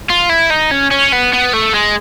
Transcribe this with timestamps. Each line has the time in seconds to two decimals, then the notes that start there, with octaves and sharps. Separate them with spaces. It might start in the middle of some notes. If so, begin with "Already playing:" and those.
0.09 F4
0.29 E4
0.50 D#4
0.71 C#4
0.91 C#4
1.12 B3
1.33 B3
1.53 A3
1.74 G#3